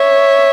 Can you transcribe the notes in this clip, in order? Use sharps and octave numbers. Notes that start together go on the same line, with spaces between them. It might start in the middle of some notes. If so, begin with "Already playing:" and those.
Already playing: C#5 E5